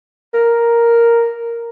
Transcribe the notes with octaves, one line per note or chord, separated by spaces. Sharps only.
A#4